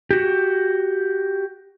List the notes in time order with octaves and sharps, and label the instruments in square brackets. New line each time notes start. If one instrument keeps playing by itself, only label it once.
[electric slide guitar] F#4 G4